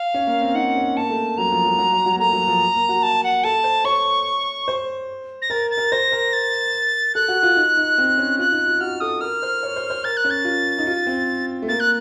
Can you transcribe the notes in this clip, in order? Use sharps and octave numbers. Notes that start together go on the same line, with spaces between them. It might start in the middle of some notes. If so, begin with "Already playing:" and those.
Already playing: F5
C#4
A#3
C4
D#4 F#5
C#4
A#3 A5
A3
F#3 A#5
F3
F#3
F#3
F#3
F#3
A#3
A3 A#5
F#3
F3
A#3
F#4
A5
F#5
A4 A5
C5
C#5 C#6
C5
A#6
A#4 A6
A6
A#4
C5 A#6
A#4
A6
A4 F#6
F#4
F4
D#4
D#4
C4
C#4
F4 F#6
D#4
F4
F#4 F6
A4 D#6
A#4 F6
C5
C#5
C5
C5
A#4 A6
F#6
C#4
A6
F4
D#4
F4
C4
A3
A#3 A6
F#6